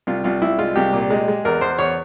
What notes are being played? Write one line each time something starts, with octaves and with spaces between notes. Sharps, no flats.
C2 F4
C2 F4
C2 E4
G#3 F4
C2 G4
A#2
G#3
G#3
E2 A#4
E2 C5
E2 C#5